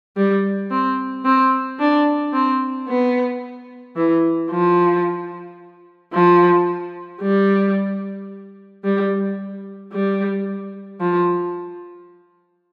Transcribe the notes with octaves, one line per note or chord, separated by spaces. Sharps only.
G3
C4
C4
D4
C4
B3
E3
F3
F3
G3
G3
G3
F3